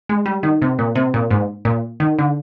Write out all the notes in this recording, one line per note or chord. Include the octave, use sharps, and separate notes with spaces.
G#3
G3
D#3
C3
A#2
C3
A#2
G#2
A#2
D#3
D3